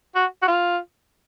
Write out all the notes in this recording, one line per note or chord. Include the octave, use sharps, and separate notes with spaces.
F#4
F#4
F4